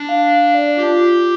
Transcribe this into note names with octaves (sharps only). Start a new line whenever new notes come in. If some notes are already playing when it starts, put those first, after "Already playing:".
Already playing: D4
F5
F5
D5
F4 G4
F4